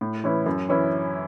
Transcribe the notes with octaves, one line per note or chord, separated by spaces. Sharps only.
A2
E3 C#4 E4
F#2
E3 C#4 E4